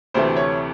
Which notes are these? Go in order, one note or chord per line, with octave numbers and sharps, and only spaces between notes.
D2 C3 E3 A3 C5
C#5